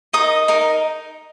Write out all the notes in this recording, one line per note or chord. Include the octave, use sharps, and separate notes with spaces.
D#4 A#4 D#5 D#6
D#4 A#4 D#5